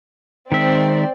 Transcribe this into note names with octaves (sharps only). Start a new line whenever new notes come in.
D#3 G#3 C4 D5 E5